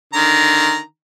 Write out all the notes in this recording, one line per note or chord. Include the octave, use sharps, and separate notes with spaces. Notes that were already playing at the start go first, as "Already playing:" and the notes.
D3 D#3 A#5